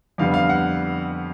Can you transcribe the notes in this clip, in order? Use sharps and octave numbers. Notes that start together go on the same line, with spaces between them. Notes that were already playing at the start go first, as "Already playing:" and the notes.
F2 D3 G3 B3 F5
F5
F#5